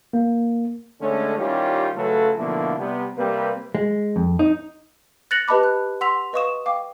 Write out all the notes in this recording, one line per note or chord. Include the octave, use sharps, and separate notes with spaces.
A#3
D3 G#3 A3 C#4
D#3 G3 C#4 E4 F4 G4
C#3 F#3 A3 F4 A4 B4
B2 D3 F3 A3 A#3 E4
C3 G3 B3
C3 G3 A#3 C4 B4
G#3
F2
D#4
F#6 A6 A#6 C#7 F7 F#7
G4 B4 D#5 A5 B5 D6
F#6
F#5 C6 E6 B6 F7
B4 D#5 F5 C#6 D#6 E7
F5 G5 D6